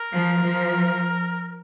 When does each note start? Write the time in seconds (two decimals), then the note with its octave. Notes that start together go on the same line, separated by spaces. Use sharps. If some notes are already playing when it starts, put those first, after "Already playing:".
Already playing: A#4
0.13 F3
0.42 F3